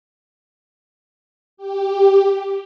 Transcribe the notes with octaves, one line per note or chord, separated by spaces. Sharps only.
G4